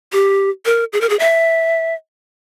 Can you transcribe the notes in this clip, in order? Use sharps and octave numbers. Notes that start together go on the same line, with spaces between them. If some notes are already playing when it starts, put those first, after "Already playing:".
G4
A#4
G#4
A#4
G#4
E5